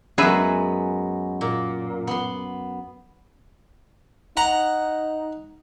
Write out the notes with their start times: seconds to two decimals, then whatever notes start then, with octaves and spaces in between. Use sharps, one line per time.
0.18 F#2 G#3 B3 G#4 B4 E5
1.41 A#2
2.07 B3 C6
4.37 D#4 F#5 A#5